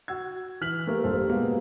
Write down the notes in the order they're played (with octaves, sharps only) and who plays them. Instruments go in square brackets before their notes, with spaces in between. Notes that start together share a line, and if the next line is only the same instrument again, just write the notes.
[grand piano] F#4 E6 G#6
E3 F6 B6 F#7
A3 A#3 G4 A#4
A#1 G2 A4 C5
B2 G#3 A#3 B3